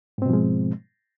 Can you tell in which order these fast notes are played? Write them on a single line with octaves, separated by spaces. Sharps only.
G#2 C4 B2 F3 G#3